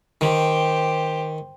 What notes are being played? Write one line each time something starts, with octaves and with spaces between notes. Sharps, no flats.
D#3 G4 C5